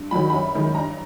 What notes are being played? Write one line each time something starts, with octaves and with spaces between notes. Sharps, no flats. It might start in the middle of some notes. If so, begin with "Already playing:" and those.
Already playing: G2
D#3 F#3 B5
F#2 B5
D#3 G#3
G2 A#5